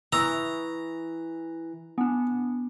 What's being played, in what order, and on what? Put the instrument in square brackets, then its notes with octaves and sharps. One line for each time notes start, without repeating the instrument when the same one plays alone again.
[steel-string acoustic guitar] E3 [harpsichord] A#5 [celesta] C#6 D#6 E6
[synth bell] B3 D4 [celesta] G#5